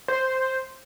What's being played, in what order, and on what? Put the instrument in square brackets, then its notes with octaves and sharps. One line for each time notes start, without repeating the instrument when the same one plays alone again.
[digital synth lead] C5